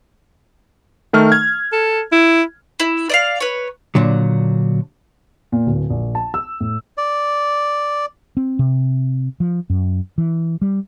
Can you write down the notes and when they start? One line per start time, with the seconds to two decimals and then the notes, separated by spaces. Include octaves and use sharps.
1.13 D#3 A3 F6
1.32 G#6
1.72 A4
2.12 E4
2.80 E4
3.10 D5 D#5 F5
3.40 B4 C#5
3.95 A#2 D3 F#3
5.52 A#2
5.67 D1
5.90 A#1
6.15 A5
6.34 E6
6.60 A2
6.97 D5
8.37 C4
8.59 C3
9.40 F3
9.70 F#2
10.18 E3
10.62 G3